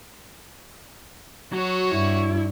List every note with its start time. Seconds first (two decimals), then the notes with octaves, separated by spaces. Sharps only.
1.53 F#3 F#4 C#5
1.91 G2 E4